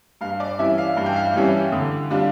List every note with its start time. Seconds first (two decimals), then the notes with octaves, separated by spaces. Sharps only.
0.21 G2 F5
0.40 D5
0.59 E3 G3 C#4 E4 E5
0.78 F5
0.97 G2 F5
1.06 G5
1.16 F5
1.34 E3 G3 C#4 E4
1.72 D3
2.10 G3 D4 F4